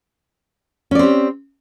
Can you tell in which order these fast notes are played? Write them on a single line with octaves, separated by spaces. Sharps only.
C#4 D5 C4 G4